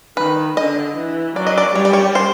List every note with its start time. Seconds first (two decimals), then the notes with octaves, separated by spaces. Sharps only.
0.17 D#3 B4
0.57 D3 D#5
0.96 E3
1.36 F#3 D5
1.47 D#5
1.58 D5
1.75 G3 C#5
1.85 D5
1.93 C#5
2.15 C5